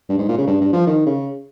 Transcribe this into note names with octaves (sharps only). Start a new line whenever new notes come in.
G2
G#2
A#2
C#3
G2
G2
F3
D#3
C#3